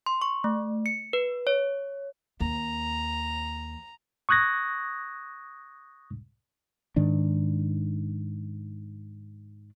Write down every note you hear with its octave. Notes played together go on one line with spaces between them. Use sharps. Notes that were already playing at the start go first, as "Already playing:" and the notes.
C6
C#6
A3
C#7
B4
C#5
D#2 A#5
C#6 D#6 F#6 G#6 A#6
G#2 D#3 D4